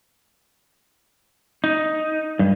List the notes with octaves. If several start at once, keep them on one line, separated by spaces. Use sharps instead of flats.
D#4
G2